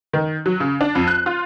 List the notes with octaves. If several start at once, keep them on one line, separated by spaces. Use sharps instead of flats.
D#3
F#3
C#3
D4
F2
F#6
F4